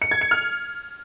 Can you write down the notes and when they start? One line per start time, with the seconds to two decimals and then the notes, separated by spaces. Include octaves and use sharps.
0.02 C#7
0.11 G#6
0.21 C#7
0.31 F6